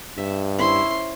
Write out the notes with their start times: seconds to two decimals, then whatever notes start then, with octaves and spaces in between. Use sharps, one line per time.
0.18 G2 E5
0.59 C#4 E4 C5 C6